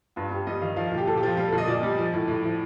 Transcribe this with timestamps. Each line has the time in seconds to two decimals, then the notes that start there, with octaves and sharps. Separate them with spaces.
0.16 G2 F4
0.31 G2 G4
0.47 G3 D#5
0.61 D#3 F5
0.76 F3 F5
0.87 F5
0.92 A#2
0.98 G4
1.07 A#2 A4
1.17 G4
1.23 F3 F4
1.37 G3 F4
1.47 A4
1.52 A#2
1.58 D#5
1.68 A#2 D5
1.83 G3
1.98 F3
2.13 A2
2.28 A2
2.43 F3